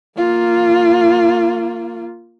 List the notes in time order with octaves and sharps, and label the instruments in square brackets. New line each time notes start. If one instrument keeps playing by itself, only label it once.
[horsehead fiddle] A#3 F4